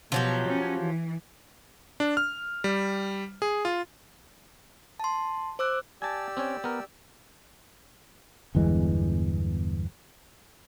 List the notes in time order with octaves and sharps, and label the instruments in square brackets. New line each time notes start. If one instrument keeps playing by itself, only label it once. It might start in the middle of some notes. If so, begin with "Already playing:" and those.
[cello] B2 [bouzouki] F3 F#3 G4
[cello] C#4
E3
[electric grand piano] D4
F6
G3
G#4
F4
[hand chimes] A5 C6
C5 D6 E6 F#6
[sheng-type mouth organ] G4 D5 E6 [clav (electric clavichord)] G#5 A5
[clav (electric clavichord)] C4 C#4 C#5
B3 A#4
[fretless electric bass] G1 E2 E3 G#3